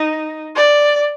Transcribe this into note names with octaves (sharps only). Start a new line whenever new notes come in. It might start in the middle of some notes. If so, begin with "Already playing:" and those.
Already playing: D#4
D5